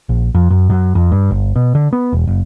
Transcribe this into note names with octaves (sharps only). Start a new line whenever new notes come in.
A#1
F2
F#2
F#2
F2
G2
G1
B2
D3
B3
E1
F#1